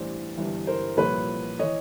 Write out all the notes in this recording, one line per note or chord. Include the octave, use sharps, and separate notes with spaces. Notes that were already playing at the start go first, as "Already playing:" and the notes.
Already playing: A1 G2 E3 C5 D5
G1 G2 E3
A#4 C5
C2 A#2 F3 B4 C#5
E3 C#5 D#5